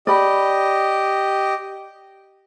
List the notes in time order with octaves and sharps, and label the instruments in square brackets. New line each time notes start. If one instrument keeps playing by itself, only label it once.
[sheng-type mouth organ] G4 D#5 [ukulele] D5 B5